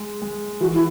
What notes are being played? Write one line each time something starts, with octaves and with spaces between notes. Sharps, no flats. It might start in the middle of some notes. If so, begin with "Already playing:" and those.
Already playing: G#3
G#3
E3 F#4
E4